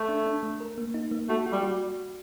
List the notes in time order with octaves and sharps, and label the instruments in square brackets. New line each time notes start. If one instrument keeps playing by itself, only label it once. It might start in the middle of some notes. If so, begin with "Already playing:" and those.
Already playing: [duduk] A3
[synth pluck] D4
D4
A3
A#4
A#3
D#4
A#3
[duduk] A3 [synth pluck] F#4
[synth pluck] F#4
[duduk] G3
[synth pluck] F#4